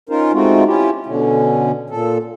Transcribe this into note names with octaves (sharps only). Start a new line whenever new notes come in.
C#4 D#4 F4 A#4 C5
G#3 A3 C4 D#4 F4 F#4
C#4 E4 F4 G4
B2 D3 C#4
A#2 A4